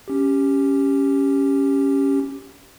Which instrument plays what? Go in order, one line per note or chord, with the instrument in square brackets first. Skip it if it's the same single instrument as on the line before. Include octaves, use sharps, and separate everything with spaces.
[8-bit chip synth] C#4 G4